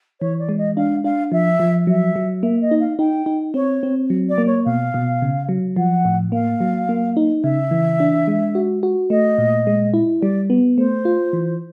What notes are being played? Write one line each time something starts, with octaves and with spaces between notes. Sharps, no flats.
E3 C#5
D5
G#3
D#5
D4 F5
D4 F5
F3 E5
F3
F#3 E5
F#3
A#3 E5
D#5
D#4
F5
D#4 G5
D#4
C4 C#5
C4
F#3
D5
A#3
C#5
B2 F5
B2
C#3
F#3
F3 F#5
A2
A#3 F5
F#3
A#3
D#4
C#3 E5
E3
D4
G#3
F#4
F#4
A3 D#5
A#2
G#3
E4
G3 D5
B3
A3 C5
F4
E3